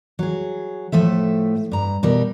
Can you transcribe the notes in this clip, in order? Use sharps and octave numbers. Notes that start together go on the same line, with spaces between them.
F#3 G#4
A2 F3 A3 E5
G2 A#5
B2 G3 A#4